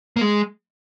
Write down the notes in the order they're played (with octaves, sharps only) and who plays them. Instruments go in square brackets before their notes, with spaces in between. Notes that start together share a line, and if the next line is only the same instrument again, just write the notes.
[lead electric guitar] A#3
G#3